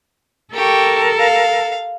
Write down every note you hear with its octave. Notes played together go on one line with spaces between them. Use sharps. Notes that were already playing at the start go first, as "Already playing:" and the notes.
G4 A4 A#4 C#6
F5